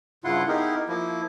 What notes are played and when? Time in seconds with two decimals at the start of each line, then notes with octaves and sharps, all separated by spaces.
0.24 G2 C#3 E4 F4 F#5 C6
0.48 B3 D#4 E4 G4 G#4 A#4
0.88 F3 A#3 E4